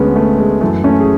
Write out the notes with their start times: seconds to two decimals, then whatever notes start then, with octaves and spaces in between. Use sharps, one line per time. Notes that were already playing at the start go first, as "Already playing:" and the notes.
Already playing: D2 D3 G#3 B3 C#4
0.16 A3
0.38 G#3
0.61 F#2 E3 A3
0.84 A3 C#4
1.00 G#4